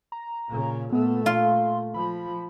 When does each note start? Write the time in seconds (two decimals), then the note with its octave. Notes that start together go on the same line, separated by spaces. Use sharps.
0.12 A#5
0.48 A#2 C#3
0.92 A#2 A3 B3
1.26 F4 C6
1.94 F3 B5